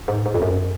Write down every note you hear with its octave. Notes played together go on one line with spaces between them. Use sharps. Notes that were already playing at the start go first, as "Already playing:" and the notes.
G#2
G#2
F2
F#2